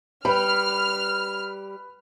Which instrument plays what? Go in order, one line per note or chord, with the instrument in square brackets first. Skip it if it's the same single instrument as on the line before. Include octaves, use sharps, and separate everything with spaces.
[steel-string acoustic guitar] G3 [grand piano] B4 B5 [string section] F6